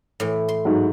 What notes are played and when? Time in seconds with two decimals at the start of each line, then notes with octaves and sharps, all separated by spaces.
0.20 A2 E3
0.48 C6
0.65 G#2 F#3